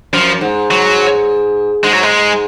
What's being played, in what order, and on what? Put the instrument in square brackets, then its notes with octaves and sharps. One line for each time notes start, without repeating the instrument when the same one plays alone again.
[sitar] F#2 [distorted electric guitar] F3
[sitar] G#2
[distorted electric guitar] F#3
[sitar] G#2 [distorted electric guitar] G#3
[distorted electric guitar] F#3
G#3